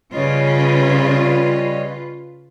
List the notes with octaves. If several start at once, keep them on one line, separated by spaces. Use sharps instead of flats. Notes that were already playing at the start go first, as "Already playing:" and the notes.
C#3 G3 C#4 F4 B4 C#5 D#5